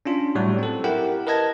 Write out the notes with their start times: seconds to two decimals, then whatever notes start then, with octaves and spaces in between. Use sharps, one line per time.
0.05 C#4 D4 F4
0.35 A2 F#3 G3 F#4
0.59 C4 A4
0.84 E4 G4 A#4 F#5 G5
1.27 A#4 B4 D#5 A5 G#6 A#6